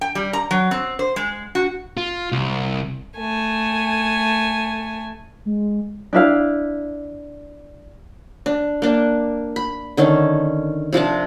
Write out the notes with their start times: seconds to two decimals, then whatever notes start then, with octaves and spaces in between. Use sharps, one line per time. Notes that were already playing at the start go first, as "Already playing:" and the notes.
0.01 G5
0.15 G3
0.33 A#5
0.51 F#3
0.71 C4
0.99 C5
1.16 G#3
1.55 F#4
1.97 F4
2.32 C2
3.17 A3 G#5
5.46 G#3
6.13 D4 E4 F5
8.46 D4
8.82 A#3 D4
9.56 B5
9.97 D3 D#3 C#4 A5
10.93 C3 F3 D4 A5